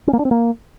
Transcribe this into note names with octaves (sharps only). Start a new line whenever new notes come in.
C#4
A#3
D4
C4
A#3